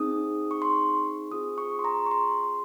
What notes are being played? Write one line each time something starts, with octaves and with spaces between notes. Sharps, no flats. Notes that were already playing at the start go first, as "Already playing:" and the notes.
Already playing: C4 D#4 G#4 D#6
C#6
C6
C#6
C4 F4 G#4 D#6
C#6
C6
A#5
C#6
C6